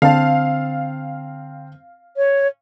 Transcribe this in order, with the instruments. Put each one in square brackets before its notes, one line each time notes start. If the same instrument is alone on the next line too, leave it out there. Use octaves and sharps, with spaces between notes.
[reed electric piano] D3 [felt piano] C4 A5 [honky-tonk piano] F5
[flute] C#5